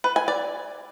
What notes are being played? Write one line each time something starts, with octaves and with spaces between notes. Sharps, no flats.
B4
G#5
D5